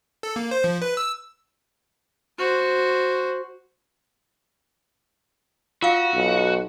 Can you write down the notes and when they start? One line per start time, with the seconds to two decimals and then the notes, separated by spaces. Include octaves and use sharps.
0.23 A4
0.36 A#3
0.51 C5
0.64 F3
0.82 B4
0.97 E6
2.38 F#4 C5
5.82 F4 F#4 F5
6.14 B1